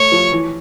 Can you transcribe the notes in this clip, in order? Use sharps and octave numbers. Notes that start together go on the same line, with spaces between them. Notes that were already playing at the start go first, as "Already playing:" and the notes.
Already playing: A3 C#5
F3
E3